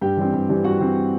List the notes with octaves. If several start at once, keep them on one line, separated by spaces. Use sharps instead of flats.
G2 G4 G5
E3 G3 C4
G2
E3 G3 C4
G2 F#4 F#5
E3 G3 C4